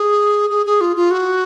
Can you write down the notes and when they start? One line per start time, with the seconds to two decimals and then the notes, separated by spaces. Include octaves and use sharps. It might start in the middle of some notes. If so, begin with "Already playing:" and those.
Already playing: G#4
0.50 G#4
0.66 G#4
0.81 F4
0.96 F4
1.11 F#4